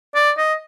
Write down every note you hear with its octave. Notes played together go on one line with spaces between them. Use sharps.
D5
D#5